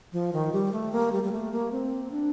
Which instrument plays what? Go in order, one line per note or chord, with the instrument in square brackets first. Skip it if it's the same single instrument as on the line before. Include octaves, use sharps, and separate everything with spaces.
[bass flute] F3
D#3
G3
A3
A#3
G3
G3
A3
A#3
C4
D4